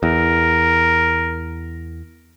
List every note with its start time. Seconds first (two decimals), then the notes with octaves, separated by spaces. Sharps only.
0.03 E2 A#4